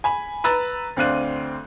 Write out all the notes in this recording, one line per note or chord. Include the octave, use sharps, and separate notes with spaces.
G#5 B5
B4 A#5 E6 A6
D2 C4 D4 F5 F#6 D#7